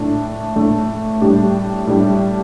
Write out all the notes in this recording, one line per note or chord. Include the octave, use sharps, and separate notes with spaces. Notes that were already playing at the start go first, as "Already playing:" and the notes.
Already playing: A2 A3 D4
A2 A3 D4
A2 G3 D4 G4
A2 G3 D4 G4